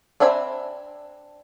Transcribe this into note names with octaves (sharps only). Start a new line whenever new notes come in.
C4 D4 E5 G#5 B5